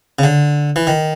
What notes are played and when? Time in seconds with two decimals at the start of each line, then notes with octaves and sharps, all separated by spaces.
0.19 C#3
0.24 D3
0.76 E3
0.87 D#3